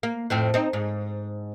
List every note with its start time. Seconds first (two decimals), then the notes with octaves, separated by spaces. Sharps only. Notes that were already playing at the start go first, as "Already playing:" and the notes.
0.03 A#3
0.30 F2 A2 C4
0.54 C4 D#4
0.73 G#2